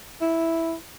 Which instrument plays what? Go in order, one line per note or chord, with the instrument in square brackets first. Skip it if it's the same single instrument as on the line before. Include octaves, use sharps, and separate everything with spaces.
[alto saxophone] E4